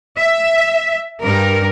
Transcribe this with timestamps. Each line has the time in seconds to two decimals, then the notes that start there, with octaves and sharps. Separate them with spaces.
0.17 E5
1.22 G2 A#4